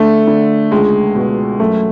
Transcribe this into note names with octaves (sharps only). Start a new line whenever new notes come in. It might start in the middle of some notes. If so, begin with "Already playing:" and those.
Already playing: D3 A3
D3
C#2 G#3
B2
F#2 A3